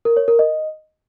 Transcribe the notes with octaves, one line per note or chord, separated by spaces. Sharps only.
A#4
C#5
A#4
D#5